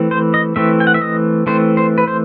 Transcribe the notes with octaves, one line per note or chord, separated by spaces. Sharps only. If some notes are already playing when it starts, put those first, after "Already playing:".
Already playing: E3 A3 C4
C5
D#5
E3 A3 C4 E5
G5
F#5
E5
D#5
E3 A3 C4 C5
C5
B4
C5